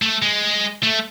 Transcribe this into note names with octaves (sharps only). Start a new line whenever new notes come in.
A3
G#3
A3